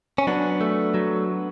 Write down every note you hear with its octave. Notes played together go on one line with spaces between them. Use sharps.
C#4
F#3 B3 D4
A3
F#3